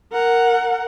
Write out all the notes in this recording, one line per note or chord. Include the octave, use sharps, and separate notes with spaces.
A#4 F#5